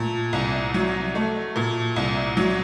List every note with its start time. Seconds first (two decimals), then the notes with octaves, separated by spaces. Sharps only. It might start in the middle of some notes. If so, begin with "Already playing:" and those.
Already playing: A#2 A3
0.33 C2
0.74 F#3
1.15 A3
1.56 A#2
1.96 C2
2.37 F#3